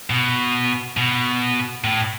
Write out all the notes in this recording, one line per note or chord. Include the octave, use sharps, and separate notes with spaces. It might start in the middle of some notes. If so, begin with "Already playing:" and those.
B2
B2
A2